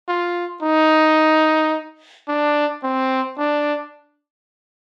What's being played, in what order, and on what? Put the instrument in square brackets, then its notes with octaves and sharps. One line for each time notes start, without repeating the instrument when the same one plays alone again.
[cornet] F4
D#4
D4
C4
D4